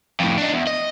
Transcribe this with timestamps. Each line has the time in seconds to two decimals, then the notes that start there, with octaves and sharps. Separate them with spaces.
0.20 F2 A2
0.38 D4 D#4
0.53 E2
0.67 D#5